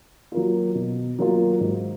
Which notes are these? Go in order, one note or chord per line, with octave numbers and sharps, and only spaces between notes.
F#3 A#3 F4
B2
F#3 A#3 F4
G#2